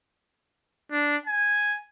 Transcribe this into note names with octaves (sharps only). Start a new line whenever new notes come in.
D4
G#5